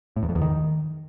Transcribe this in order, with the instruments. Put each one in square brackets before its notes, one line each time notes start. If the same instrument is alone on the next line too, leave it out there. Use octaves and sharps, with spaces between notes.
[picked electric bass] A2
E2
F2
E2
D#3